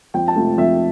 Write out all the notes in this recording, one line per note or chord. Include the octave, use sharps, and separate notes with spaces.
F2 G5
A5
C3 F3 A3
F2 E5